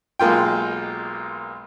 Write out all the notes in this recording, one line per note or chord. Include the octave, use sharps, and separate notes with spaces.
B1 G#3 A#3 F4 G5